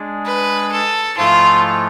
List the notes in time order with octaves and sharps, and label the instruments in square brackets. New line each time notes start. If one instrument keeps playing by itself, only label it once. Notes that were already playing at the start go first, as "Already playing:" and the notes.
Already playing: [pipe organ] G#3 D4 G#4 D5
[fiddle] B4
A4
[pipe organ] G#2 F3 A3 E4 A4 [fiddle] F4